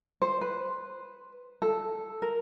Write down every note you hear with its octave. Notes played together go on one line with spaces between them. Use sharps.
C5
B4
A4
A#4